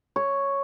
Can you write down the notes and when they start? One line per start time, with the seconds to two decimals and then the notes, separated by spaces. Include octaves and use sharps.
0.16 C#5